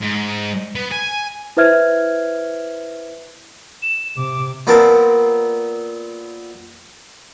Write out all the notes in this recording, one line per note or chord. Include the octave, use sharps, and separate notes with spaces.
G#2
B3
G#5
E4 B4 C5 E5 F6 G#6
E7
C3 D6
A#2 B3 C4 A#4 A5